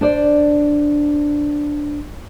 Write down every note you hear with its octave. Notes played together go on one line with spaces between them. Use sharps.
D4 C5 D5